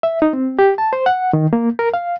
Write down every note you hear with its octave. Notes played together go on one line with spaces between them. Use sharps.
E5
D#4
C4
G4
A5
C5
F#5
D#3
A#3
A#4
F5